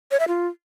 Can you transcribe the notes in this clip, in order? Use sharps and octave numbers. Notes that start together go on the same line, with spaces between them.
C#5
E5
F4